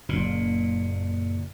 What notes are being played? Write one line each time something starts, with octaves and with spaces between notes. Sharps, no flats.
F#1 A#2